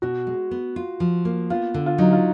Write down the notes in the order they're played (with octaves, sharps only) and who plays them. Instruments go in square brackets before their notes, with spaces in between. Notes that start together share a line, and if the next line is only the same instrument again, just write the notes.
[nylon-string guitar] B2 [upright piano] F#4
[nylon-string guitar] G#3
B3
F4
F3
A#3
[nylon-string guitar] B3 [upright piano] F4
[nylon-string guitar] D3
[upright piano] F4
[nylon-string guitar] F#3 [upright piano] D#4
[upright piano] F4